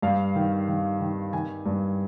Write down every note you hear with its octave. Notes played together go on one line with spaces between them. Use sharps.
G2 F5
D#3
D#3
D#3
D#3 G#5
G2